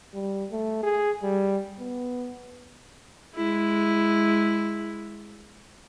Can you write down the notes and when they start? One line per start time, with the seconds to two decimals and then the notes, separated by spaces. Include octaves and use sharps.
0.14 G3
0.51 A3
0.83 G#4
1.23 G3
1.80 B3
3.36 G#3 E4